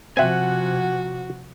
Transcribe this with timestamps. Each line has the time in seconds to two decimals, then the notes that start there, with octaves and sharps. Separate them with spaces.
0.17 C3 F3 C4 F#4 E5 F#5 G#5